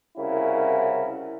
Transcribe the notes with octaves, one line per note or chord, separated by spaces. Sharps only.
C2 C#3 E4 F#4 A#4